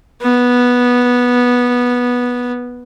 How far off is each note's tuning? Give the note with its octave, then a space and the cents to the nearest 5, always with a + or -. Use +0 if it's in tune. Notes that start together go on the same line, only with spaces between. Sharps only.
B3 -10